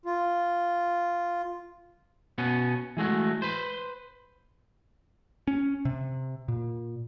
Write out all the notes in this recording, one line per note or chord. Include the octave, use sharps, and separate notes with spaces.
F4
B2 B3 C#4
E3 G#3 A3 F#4
B4 C5
C#4
C3
A#2